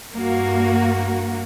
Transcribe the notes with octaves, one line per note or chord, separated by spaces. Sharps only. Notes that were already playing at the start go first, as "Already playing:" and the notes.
G2 A#3 F#4